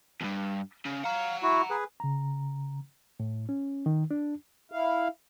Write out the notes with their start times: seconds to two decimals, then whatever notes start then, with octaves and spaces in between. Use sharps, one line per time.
0.21 E2 G2
0.85 C#3
1.04 F5 F#5 A#5
1.43 E4 F#4
1.70 G#4 B4
2.00 C#3 A#5
3.20 A2
3.49 C#4
3.86 D#3
4.11 D4
4.72 E4 F5